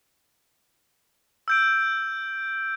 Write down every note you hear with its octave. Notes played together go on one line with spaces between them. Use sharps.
E6 G6 D7